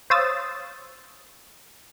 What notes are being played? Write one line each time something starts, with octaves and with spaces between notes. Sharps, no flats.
C5 C#5 F5 D#6 E6 A6